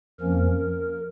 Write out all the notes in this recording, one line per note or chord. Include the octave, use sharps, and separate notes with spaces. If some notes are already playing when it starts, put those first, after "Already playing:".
F2 F3 A#3 C#4 A#4